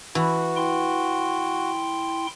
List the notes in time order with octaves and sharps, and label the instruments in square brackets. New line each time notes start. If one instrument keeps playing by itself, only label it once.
[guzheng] E3 [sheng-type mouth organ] F#4
[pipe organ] E4 G5 C6